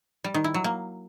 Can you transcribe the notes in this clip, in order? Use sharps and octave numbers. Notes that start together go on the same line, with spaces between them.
G3
D#3
E4
F#3
A#3